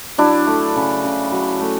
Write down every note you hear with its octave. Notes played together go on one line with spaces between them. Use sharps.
F#3 D4 E4
A3
C#3
C#3
F#3
A3